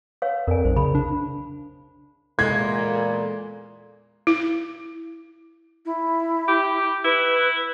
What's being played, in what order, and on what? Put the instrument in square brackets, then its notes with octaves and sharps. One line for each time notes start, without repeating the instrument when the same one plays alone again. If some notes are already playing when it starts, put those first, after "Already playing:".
[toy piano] B4 C#5 F5
[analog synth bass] F2 [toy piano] A#4 D5 G#5
[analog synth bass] B1 [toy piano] C5
[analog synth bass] C#3 [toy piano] B5
[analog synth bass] D4
[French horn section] E2 A#2 [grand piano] G#3 [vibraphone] A4 [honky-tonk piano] G#6
[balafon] E4
[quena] E4
[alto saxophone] G4
[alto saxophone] E4 [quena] B4